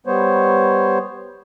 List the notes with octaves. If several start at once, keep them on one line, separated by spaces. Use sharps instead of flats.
G3 B3 C5 C#5